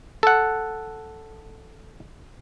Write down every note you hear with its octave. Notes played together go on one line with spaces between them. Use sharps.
A4 F#5